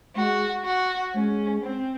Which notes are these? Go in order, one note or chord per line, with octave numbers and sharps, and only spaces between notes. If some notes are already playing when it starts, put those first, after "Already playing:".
G#3 F#4
F#4
G#3 C#4
C4